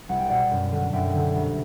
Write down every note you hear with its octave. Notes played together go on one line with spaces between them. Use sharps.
C2 F#5
G5
B2 D5 F#5
F#2
D3
F#2 E5 G5
D3
C2